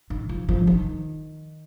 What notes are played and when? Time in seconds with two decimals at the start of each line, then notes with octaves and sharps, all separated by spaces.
0.10 D#3
0.29 F3
0.49 F3
0.67 D#3